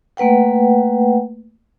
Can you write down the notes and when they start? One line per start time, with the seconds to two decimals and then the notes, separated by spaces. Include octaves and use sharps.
0.17 A3 A#3 B4 F#5 G5